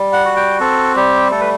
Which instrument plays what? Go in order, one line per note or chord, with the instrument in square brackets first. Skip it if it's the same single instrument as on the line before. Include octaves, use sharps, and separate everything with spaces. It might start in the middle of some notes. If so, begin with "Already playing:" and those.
Already playing: [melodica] G3
F#5
F#4
G5
C4 A4
G3 G4
A3 A4
B4